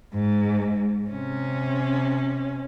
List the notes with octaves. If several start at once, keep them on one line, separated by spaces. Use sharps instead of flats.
G#2
C3 C#4